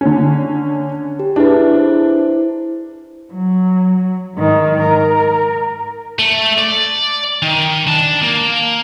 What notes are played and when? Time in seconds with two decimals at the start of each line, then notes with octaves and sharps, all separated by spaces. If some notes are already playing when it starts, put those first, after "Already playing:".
0.01 D3 C#4
1.19 G4
1.36 D4 E4 G#4 B4
1.75 E4 C5
3.33 F#3
4.35 G#2 D#3
4.83 A#4
6.19 A3
6.58 D5
7.42 D#3
7.87 D4 A5
8.22 A#3